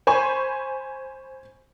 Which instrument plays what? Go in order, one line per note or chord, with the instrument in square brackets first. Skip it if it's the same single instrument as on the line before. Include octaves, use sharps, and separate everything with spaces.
[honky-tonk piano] C5 G#5 B5 C#6